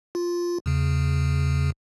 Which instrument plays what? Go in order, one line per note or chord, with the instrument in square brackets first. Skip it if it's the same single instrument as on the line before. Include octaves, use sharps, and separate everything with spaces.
[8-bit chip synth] F4
E2 C#3